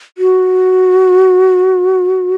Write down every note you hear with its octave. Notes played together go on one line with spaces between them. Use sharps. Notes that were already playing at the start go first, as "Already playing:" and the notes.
F#4